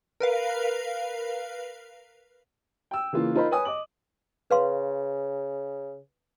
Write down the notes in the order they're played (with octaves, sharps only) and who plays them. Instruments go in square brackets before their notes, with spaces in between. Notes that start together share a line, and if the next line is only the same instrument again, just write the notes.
[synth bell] A#4 B4 F5
[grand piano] G5 E6
C#3 E3 A#3 F4
D#4 F4 A#4 C5 D#5 B5
B4 C#5 G#5 D#6
D#5 D6 F#7
[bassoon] C#3 [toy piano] B4 F5 C6